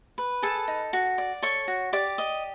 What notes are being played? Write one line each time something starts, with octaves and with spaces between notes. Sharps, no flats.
B4
G#4 A4 A5
D#4
F#4
D5
A4 C#5 C#6
F#4
G4 D5 D6
D#5